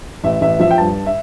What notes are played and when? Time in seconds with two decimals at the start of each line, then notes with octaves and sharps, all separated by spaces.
0.24 A1 E5
0.41 A1 E5
0.60 F3 E5
0.71 G5
0.78 G2 A5
1.06 E5